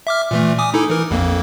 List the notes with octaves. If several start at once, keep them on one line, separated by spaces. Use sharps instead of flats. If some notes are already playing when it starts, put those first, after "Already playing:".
E5 D6 F6
A#2 E3 A3
G#5 D6 D#6
D#4 E4 A4
E3 A#4
A#1 F2 A#3